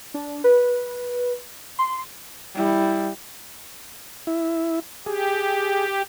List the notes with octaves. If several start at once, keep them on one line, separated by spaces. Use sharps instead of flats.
D4
B4
C6
G3 E4
E4
G4 G#4